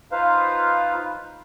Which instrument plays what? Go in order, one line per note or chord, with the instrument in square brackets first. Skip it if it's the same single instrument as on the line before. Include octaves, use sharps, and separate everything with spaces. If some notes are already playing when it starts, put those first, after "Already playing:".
[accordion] D#4 F4 B4 C5 F5